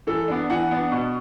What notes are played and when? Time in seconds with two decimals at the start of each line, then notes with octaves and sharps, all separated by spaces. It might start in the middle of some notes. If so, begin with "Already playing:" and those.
0.07 E3 A4
0.28 B3 D4
0.50 E3 F#5
0.71 B3 D4
0.92 B2